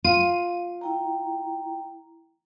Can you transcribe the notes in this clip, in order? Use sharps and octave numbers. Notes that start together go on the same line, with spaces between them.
F4 D#7
E4 G5 A#5